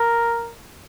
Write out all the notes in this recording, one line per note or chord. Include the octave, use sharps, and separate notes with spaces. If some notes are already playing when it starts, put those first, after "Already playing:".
Already playing: A#4